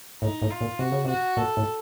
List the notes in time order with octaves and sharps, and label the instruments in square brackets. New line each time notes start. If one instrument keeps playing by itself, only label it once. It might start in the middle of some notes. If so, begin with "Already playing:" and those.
[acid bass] A2 [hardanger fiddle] D#4
[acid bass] A2
[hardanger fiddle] F4
[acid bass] A#2
[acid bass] C3 [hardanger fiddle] F#4
[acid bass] C#3
[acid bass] C3 [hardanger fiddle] F#4
[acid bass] A#2 [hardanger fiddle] A4
[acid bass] A2